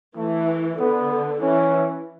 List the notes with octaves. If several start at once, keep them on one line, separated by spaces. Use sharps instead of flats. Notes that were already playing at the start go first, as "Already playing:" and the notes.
E3 A3
D3 B3
E3 C#4